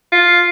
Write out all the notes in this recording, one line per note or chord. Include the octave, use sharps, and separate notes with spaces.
F4